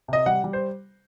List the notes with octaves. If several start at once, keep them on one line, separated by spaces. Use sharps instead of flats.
C3 D#5
G3 F#5
G3
C5